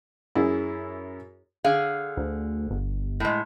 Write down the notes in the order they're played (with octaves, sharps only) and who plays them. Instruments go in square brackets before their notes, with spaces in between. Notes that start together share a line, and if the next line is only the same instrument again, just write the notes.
[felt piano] F#2 [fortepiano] E4 G#4
[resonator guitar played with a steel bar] D3 G#4 F5
[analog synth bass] D2
G1
[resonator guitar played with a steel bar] A2 G#3